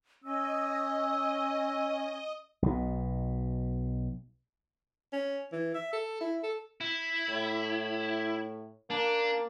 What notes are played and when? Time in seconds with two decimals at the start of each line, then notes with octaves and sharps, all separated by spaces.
0.24 C#4 D#5 E6
2.62 B1 B2
5.13 C#4
5.53 E3
5.75 E5
5.93 A4
6.21 E4
6.43 A4
6.81 E4
7.30 A2
8.90 A#3 D4